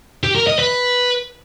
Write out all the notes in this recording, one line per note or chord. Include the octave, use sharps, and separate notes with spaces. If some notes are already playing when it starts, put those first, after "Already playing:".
G4
A#4
D#5
B4